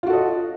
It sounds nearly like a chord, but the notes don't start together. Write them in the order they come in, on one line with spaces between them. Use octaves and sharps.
F4 F#4 A4 D#5